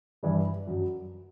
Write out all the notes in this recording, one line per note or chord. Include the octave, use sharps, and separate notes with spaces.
G2 E3 G3 D5
F#2 F#3